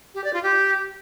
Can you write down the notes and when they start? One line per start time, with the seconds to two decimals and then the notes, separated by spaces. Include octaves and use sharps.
0.14 G4
0.24 D5
0.34 F4
0.43 G4